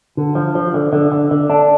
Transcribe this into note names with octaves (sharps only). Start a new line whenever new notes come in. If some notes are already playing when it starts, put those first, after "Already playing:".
D3
F3
F3
D3
D3
D3
D3
D4